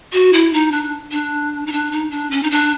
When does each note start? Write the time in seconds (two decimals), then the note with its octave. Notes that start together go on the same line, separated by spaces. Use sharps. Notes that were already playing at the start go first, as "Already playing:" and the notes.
0.13 F#4
0.33 E4
0.53 D#4
0.72 D4
1.12 D4
1.67 D#4
1.72 D4
1.92 D#4
2.11 D4
2.31 C#4
2.43 D#4
2.51 D4